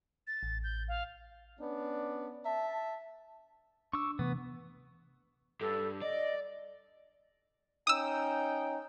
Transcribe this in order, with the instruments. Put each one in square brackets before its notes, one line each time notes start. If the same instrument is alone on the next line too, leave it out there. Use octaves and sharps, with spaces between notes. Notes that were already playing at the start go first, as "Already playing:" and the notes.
[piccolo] A6
[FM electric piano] A1
[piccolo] G6
F5
[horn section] B3 C#4 D4
E5 A5
[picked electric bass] D4 [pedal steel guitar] C#6 D6 E6
[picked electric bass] C3 E3 A3 [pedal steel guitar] B3
[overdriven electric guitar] G2 [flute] A4
[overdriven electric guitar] D5 [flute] D#5
[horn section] C#4 D#4 G5 [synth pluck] D#6 E6